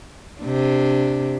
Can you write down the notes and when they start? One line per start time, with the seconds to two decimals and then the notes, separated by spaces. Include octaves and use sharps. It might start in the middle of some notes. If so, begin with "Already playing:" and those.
0.42 C3 D4